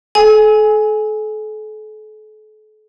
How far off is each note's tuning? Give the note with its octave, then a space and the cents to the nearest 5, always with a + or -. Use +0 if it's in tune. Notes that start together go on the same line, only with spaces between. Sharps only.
A4 -40 G#5 +0